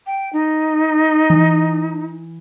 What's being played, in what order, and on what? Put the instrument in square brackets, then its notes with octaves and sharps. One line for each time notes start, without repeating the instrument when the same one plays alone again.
[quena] G5
D#4
[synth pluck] E3